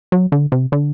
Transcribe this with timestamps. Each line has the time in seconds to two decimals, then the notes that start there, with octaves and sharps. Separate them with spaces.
0.12 F#3
0.32 D3
0.52 C3
0.72 D3